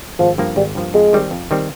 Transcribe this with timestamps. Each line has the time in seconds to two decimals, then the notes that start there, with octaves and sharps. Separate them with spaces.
0.19 G#1 F3
0.38 G2 F3 A#3
0.56 G#1 G3
0.75 G2 F3 A#3
0.94 F2 G#3
1.13 D#3 G3 C4
1.31 F2
1.51 D#3 G3 C4